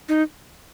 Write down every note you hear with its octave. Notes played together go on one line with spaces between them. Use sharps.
D#4